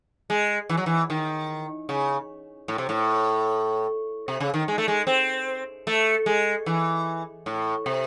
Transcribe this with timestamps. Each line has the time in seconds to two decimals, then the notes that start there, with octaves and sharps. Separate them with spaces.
0.30 G#3
0.69 E3
0.77 F#3
0.86 E3
1.10 D#3
1.89 C#3
2.68 A2
2.78 C3
2.89 A2
4.28 C3
4.40 C#3
4.54 D#3
4.68 G#3
4.78 A3
4.88 G#3
5.07 C4
5.87 A3
6.26 G#3
6.66 E3
7.46 A2
7.86 C3